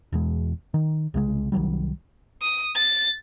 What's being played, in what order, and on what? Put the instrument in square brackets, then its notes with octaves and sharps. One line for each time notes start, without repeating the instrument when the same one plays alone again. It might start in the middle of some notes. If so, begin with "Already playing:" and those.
[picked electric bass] E1 E2 G#3
D#3
C2 C#3 G3 G#3
C2 D#3 F#3 G3
[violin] D#6
A6